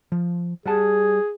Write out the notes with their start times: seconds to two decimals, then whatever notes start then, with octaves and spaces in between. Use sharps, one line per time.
0.12 F3
0.66 G3 G#4 F#5 A5